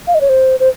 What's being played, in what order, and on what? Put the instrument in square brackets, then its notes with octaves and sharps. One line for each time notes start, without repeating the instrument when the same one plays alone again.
[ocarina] F5
D#5
C#5
C5
C5